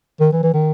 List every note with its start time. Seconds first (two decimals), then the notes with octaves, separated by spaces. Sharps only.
0.20 D#3
0.32 E3
0.43 E3
0.54 D#3